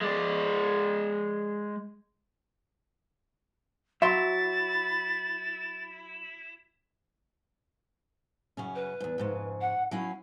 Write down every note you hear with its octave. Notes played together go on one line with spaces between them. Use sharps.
G#3 D5
F#3 E4 E5 C6 A6
F#2 C#3 C#4
B4
E2 G#2
F2 G#2 C#3
F#5
F#3 C#4 E4 F5